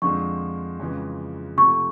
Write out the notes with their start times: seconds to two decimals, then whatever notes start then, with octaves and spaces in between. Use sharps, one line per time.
0.02 F2 D3 F3 G#3 C4 C#6
0.80 F2 C#3 E3 G#3
1.57 C3 F3 A3 C4 C#6